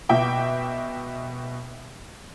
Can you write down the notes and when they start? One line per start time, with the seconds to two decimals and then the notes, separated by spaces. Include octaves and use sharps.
0.09 B2 E5 G5 D6